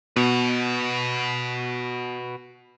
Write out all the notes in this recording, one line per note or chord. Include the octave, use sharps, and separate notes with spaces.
B2 F#4 B4